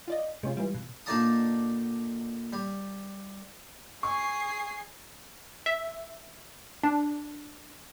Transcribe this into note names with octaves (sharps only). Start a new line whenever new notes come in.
F4 D5 D#5
C3 G#3 C#4 F4
E3 G3 G#3 F4
B2
A#2 D3 D#4 D5 A5 D#6
G3
G#4 C#6 C7
E5
D4